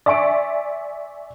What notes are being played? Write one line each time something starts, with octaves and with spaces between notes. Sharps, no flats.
D5 E5 G#5 C6 C#6 D7